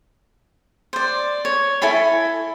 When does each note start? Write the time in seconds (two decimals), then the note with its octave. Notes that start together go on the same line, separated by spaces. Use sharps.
0.93 C5 D5
1.45 C#5
1.82 E4 A4 G#5 B5